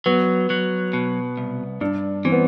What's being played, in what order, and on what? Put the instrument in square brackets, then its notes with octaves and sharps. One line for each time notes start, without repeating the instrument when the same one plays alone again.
[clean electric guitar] F#3 [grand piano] B3
[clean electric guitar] F#3
B2
C2
[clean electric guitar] G2 [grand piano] D4
[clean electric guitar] E3 [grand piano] C4
[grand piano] B3